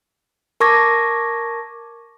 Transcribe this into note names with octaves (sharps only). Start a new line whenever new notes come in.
A#4 A5 C#6 D6 G#6 A#6